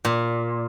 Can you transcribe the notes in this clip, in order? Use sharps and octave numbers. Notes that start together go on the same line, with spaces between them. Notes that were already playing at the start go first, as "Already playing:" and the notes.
A#2